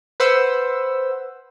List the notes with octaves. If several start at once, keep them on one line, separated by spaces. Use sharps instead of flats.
B4 C5 F#5 E6